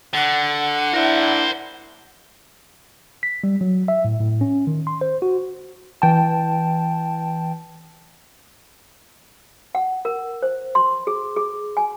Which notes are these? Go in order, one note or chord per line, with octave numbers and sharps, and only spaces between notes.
D3 F#5
D4 E4 A#4 C5
B6
G3
F#3
E5
A2
A2
C#4
D#3
C6
C5
F#4
E3 G5 A5
F#5
A#4
C5
C6
G#4
G#4
G#5